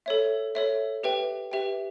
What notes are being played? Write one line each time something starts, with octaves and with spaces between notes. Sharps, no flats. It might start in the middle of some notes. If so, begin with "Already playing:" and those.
A4 C#5 E5
A4 C#5 E5
G4 B4 E5 G5
G4 B4 E5 G5